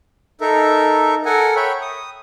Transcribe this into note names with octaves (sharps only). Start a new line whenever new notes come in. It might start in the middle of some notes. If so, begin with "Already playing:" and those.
D#4 A4 A#4 E5
A4 A#4 F#5 G#5
C#5 E5 G5 B5
D#6